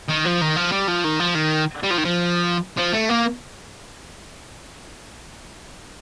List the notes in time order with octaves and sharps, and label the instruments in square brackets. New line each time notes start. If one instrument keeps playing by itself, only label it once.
[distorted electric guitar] D#3
F3
D#3
F3
G3
F3
D#3
F3
D#3
G3
F3
D#3
F3
F3
A3
A#3